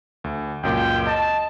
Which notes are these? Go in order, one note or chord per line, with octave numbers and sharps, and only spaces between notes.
D2
C#2 F#2 A#2 G5
D#5 A5